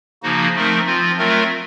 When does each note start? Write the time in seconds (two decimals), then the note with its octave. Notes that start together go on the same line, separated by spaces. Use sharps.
0.23 C#3 F3 A#3 D#4 F#4
0.54 F3 A3 C4 D#4 A#4
0.86 F3 C4 F4
1.18 F#3 A3 C4 F4 A#4